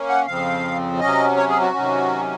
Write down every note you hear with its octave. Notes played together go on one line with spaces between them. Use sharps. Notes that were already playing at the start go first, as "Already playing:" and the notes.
Already playing: A#3 C#4
F#5
F2 C#3 F3 C4 F5
C3 F#3 C#4 D#5
C#5
G#4
F#4
C3 D#3 F#3 C#4